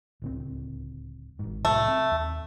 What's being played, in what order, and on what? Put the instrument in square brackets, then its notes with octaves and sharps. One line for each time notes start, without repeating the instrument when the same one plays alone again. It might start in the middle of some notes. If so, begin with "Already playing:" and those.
[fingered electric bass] D1 C#2 C4
G#1 G#2
[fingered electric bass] C2 A2 F#3 [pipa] A3
[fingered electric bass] C4
D#2